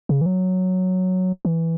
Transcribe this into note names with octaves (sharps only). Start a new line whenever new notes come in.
C#3
E3
F#3
E3